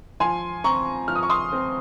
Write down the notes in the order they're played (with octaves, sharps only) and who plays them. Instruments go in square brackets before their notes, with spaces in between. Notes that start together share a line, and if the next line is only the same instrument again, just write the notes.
[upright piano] F3 G#5 C6
C4 A#5 C#6
F3 F6
D#6
C#6
C6 D#6
C4